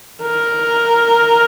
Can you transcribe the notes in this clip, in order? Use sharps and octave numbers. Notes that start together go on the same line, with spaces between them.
A#4